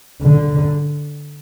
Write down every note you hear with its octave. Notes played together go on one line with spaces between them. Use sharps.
D3